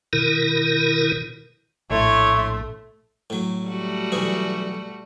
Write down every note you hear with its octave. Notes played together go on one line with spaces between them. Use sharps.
B2 D#3 E4 A#4
A#1 A2 A3 E4 C#5 C6
A2 F#3
G3 A3 F#4
B1 E3 G#4